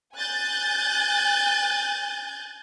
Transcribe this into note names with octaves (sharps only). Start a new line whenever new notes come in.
G#5 F#6 G6 A6